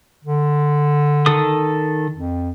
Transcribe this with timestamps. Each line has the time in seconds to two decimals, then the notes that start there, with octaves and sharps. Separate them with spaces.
0.24 D3
1.26 D#3 A4 D#6
2.13 F2